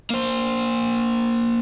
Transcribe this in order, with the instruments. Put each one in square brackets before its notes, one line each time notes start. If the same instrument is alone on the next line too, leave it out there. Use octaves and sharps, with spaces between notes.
[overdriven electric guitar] A#3 C5